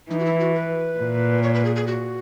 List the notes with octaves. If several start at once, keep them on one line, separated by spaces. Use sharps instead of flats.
E3 D#4
F#4
E4
F#4
B4
A#2
C#5
B4
G#4
G#4
F#4